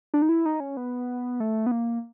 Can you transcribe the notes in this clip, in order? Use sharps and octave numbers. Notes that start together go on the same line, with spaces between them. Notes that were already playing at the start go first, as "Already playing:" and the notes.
D4
D#4
E4
D#4
C#4
B3
A3
B3
A#3